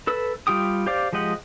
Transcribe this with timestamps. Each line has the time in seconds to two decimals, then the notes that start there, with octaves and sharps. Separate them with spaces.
0.07 A4 B4 E6
0.47 G3 F4 G4 G5 D#6
0.86 G4 C5 D5 F5 D6
1.13 F3 G#3 G4 D#5 F#5